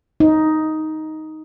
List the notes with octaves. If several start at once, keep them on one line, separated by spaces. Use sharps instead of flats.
D#4